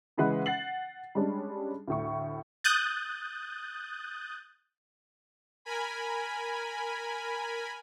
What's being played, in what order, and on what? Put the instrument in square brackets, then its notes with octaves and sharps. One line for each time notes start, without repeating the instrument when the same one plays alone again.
[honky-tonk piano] C#3 E3 G#3 B4 F#5
F#5 A6 C7 F#7
G3 G#3 C#4 D4
D2 A2 C#6
[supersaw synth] D#6 F#6 G6 A6
A#4 G#5 B5